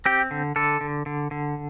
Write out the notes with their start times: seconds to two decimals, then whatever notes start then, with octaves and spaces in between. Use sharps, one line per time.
0.06 C4 G4
0.31 D3
0.56 D3 A4
0.81 D3
1.06 D3
1.31 D3